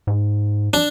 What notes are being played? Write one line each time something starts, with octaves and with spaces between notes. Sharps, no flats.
G#2
D4